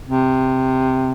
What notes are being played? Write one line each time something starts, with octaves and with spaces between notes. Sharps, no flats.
C3